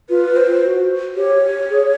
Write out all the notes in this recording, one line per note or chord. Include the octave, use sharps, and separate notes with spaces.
F4 B4
C5
F#4
G4 C#5
G#4